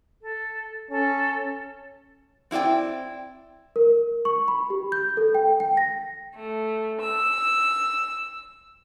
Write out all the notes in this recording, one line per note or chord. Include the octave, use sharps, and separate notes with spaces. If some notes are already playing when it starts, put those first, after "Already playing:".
A4
C#4 A4
C4 E4 F4 D5 G5
A#4
C#6
B5
G4
G6
A4
G5
G5
A#6
A3
E6